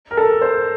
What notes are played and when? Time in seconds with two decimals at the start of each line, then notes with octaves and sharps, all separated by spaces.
0.11 A#4
0.17 A4
0.41 C5